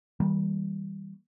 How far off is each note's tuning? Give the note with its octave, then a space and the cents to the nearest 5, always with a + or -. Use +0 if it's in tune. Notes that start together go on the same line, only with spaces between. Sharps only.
E3 -45 G3 +0 A#3 +0